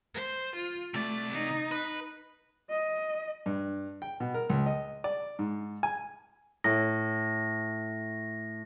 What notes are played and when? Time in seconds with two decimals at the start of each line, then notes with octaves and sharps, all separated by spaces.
0.14 C5
0.56 F4
0.94 C3 A3 D5
1.32 D#4
1.71 B4
2.70 D#5
3.46 G2
4.02 G5
4.20 B2
4.34 A#4
4.50 C#2
4.66 D#5
5.04 D5
5.39 G#2
5.83 G#5
6.64 A2 A#6